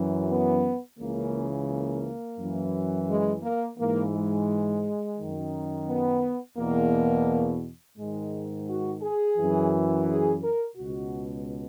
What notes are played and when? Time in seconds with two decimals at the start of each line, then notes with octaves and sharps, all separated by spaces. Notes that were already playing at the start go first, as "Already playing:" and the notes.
Already playing: F#2 E3
0.29 B3
0.99 C#2 C#3 E3 A#3
1.69 A#3
2.38 F#2 E3
3.09 G#3
3.43 A#3
3.79 G#2 E3 A#3
4.14 G#3
5.18 F#2 D#3
5.89 B3
6.58 E2 B2 A#3
7.98 G#2 D#3 G#3
8.68 F#4
9.02 G#4
9.37 F#2 E3
10.08 G#4
10.42 A#4
10.76 C#2 B2 F#4